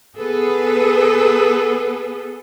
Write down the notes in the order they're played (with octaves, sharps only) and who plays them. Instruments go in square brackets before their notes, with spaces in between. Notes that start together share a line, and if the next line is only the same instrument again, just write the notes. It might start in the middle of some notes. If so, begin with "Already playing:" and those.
[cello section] B3 G#4 A4 B4